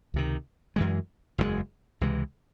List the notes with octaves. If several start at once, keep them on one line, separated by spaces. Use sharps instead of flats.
C#2 C3 D#3
F#2 E3 G#3
F#1 E2 C#3 G#3
C#2 C3 E3 G#3